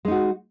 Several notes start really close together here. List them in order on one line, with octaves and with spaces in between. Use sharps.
G#3 D#4 F#4